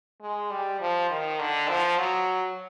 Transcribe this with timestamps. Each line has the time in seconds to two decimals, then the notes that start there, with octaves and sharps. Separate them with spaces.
0.22 G#3
0.51 G3
0.81 F3
1.10 D#3
1.39 D3
1.69 F3
1.99 F#3